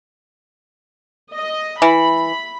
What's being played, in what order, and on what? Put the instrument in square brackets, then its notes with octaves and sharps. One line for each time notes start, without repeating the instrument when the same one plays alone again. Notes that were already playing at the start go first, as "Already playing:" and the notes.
[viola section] D#5
[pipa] E3 [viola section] B5